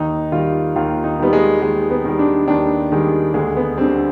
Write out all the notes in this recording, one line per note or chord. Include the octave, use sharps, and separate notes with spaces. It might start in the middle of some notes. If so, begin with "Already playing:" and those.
Already playing: D#2 D#4
D#3 G3 F4
D#2 F4
D#4
D#3 G3 B3
G#3
D#2 G#3
B3
D#3 G3
D4
D#2 D4
D#3 G3 G#3
D2 G#3
B3
D3 G3 C4